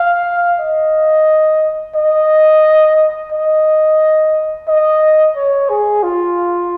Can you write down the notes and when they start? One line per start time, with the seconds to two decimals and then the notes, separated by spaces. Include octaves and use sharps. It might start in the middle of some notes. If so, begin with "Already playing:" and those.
Already playing: F5
0.60 D#5
1.96 D#5
3.32 D#5
4.68 D#5
5.36 C#5
5.69 G#4
6.03 F4